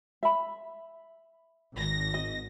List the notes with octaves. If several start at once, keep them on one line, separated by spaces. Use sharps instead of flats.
E5 B5
G#1 A#6
D#5